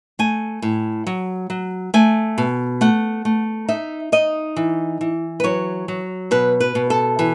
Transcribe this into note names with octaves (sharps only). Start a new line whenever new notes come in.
A3 G#5
A2
F#3
F#3
A3 G#5
B2
A3 F#5
A3
D#4 E5
D#4 D#5
E3
E3
B4
F#3 C#5
F#3
B2 B4
B4
B2
A4
E3